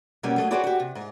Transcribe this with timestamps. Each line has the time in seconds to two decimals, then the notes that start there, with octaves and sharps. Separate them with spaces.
0.23 B2 F#3 G3 A#3 C#4
0.36 F#3 A3 D#5
0.51 C4 F#4 G#4 B4 C#5 D5
0.64 F#4 G4
0.80 C3
0.95 G#2